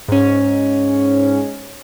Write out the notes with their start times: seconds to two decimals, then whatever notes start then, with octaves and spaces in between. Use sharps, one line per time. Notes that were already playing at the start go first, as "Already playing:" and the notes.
0.08 G#2 C#4